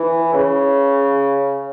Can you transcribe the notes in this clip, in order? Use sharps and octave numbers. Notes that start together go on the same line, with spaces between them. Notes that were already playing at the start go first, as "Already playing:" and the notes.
Already playing: E3
C#3